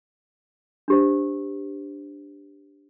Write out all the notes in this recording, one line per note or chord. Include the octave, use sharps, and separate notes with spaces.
D4 G4 C5